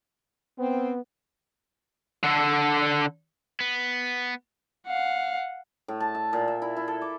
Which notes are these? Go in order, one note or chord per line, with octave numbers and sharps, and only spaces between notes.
B3 C4
D3 A4
B3
F5 F#5
A2
A5
E5
A#2
E5
E4
E4
A4
D6